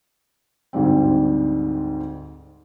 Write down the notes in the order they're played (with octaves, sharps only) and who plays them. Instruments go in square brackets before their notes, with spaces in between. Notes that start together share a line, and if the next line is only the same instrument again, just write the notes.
[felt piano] D2 G#2 G3 C4